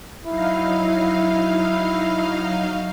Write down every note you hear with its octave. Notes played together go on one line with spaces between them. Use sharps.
F#3 D#4 E4 F5